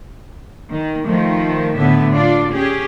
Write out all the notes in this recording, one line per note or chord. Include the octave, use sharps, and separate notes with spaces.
D#3
D#3 F3 A3
A2 D3 B3 E5
D4 F4 D5
C#4 G4 G#4